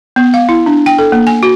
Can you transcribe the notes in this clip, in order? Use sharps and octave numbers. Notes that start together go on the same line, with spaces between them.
B3
F5
E4
D4
G5
A4
A#3
G#5
F#4